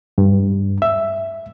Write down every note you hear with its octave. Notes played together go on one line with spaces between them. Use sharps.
G2
E5